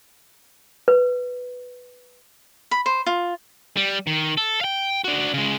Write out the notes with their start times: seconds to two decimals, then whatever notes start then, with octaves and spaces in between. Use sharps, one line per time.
0.88 B4
2.71 B5
2.86 C5
3.06 F4
3.77 G3
4.07 D#3
4.37 A4
4.61 F5 G5
5.04 D4 F#4
5.34 C#3 G#3